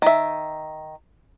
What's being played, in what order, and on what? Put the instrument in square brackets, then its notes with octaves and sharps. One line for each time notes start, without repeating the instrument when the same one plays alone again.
[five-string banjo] D#3 E5